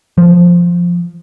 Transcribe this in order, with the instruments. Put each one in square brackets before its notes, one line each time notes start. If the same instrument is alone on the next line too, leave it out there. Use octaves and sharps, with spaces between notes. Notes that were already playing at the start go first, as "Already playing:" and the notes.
[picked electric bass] F3